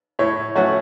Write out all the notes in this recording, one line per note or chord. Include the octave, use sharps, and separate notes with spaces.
A2 C#5
F#3 A3 C#4 F#4 C#5